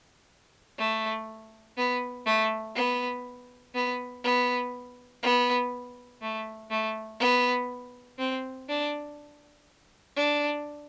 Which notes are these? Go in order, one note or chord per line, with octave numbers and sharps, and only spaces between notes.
A3
B3
A3
B3
B3
B3
B3
A3
A3
B3
C4
D4
D4